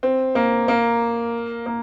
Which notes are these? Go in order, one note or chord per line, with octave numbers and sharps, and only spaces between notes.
C4
A#3
A#3
A#3